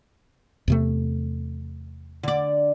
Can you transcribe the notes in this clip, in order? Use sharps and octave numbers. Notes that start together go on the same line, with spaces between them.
E2 C3 A3
D3 D5